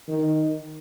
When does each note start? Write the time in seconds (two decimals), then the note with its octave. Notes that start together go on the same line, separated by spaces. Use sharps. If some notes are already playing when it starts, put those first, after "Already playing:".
0.08 D#3